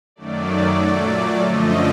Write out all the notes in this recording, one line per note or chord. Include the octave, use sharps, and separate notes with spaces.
F#2 D#3 F#3 A3 D5
A#2 F#3 A3
F#2 D3 F3 A3 D#5